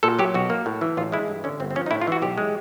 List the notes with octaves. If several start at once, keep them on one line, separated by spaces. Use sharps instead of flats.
A#2 A4
F#3 G4
B1 F#4
A#3
A2
E3
A1 F4
G#3 E4
G2
D3 C#4
G1 C4
C4
F3 C#4
D#4
A2 E4
F4
E3 F#4
B1 G4
G#3